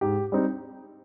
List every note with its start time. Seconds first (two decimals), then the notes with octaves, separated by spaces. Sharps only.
0.01 G#2 G4
0.32 G3 C4 D#4